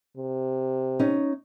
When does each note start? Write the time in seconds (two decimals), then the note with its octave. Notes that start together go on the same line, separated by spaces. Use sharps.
0.17 C3
0.99 C#4 D#4